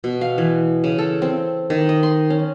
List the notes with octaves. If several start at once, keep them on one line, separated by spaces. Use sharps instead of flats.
B2
F5
E3
C#3
A4
C4
D#3
D#5
C6
C#4